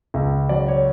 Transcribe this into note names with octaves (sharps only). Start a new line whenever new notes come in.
C#2
F#3 D5
C#5